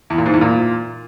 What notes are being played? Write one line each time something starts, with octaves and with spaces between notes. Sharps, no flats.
E2
A#2
G#2
E2
A#2